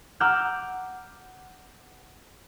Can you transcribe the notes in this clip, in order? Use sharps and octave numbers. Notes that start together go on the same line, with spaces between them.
F#5 A#5 D6 E6 F6 G6